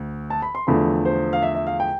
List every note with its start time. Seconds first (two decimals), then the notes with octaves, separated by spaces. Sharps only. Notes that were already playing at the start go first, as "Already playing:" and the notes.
Already playing: D2
0.30 A5
0.42 B5
0.55 C6
0.67 E2 D3 F3 A3 B5
1.05 C5
1.33 F5
1.43 E5
1.55 E5
1.67 F5
1.80 G5